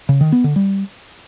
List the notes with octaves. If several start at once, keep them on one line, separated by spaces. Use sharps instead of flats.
C#3
D#3
B3
D3
G3